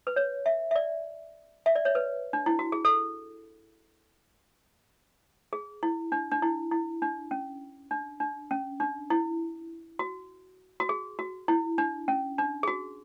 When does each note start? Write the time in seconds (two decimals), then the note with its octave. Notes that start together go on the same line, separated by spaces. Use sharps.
0.07 B4
0.16 C#5
0.46 E5
0.71 E5
0.76 D5
1.66 E5
1.75 D5
1.85 C#5
1.95 B4
2.33 D4
2.46 E4
2.59 F#4
2.72 G#4
2.85 A4
5.53 G#4
5.83 E4
6.12 D4
6.31 D4
6.42 E4
6.71 E4
7.02 D4
7.31 C#4
7.91 D4
8.20 D4
8.51 C#4
8.80 D4
9.10 E4
9.99 F#4
10.80 F#4
10.89 G#4
11.19 F#4
11.48 E4
11.78 D4
12.08 C#4
12.38 D4
12.63 G#4
12.67 F#4